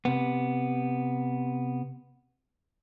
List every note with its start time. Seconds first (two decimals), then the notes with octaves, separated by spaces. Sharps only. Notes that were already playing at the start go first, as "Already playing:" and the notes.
0.05 C3 B3